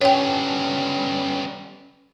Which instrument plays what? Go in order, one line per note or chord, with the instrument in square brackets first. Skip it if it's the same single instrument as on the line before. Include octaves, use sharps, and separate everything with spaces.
[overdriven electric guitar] G3 B3 [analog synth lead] C#4 [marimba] C#5 G5